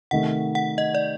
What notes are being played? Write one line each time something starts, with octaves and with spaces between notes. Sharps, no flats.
C3 D#3 A3 F#5
F#5
D#5
D5